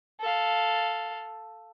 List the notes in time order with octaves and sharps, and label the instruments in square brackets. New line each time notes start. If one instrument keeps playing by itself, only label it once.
[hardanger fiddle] A4 F5